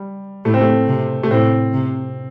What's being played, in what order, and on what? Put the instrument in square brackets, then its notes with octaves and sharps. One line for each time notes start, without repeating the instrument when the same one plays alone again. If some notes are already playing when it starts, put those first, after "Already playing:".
Already playing: [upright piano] G3
[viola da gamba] A2 [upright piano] A3
[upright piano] C4
A3
[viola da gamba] C3
[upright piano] A3
[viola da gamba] A2 [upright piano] C4
[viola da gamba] C3